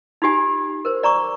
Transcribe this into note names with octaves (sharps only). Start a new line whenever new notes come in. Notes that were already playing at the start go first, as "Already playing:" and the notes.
D#4 F4 G4 G#5
A#4 C5
D5 A#5 C#6 D6